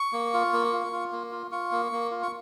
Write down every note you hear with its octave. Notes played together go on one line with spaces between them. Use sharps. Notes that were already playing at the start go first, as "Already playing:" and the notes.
Already playing: C#6
A#3
F4
A#3
F4
F4
A#3
F4
F4 C#6
A#3
A#3
F4
C#6